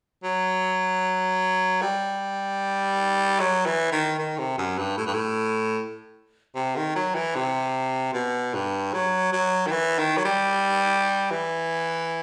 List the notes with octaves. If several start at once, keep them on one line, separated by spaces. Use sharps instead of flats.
F#3
G3
F#3
E3
D#3
D#3
C3
F#2
G2
A2
G2
A2
C3
D#3
F#3
E3
C3
B2
G2
F#3
F#3
D#3
E3
D#3
F#3
G3
E3